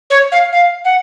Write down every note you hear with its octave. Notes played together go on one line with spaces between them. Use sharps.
C#5
F5
F5
F#5